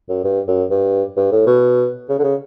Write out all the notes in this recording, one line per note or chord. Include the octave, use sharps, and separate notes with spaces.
F#2
G2
F#2
G2
G2
A2
B2
C#3
D3
C#3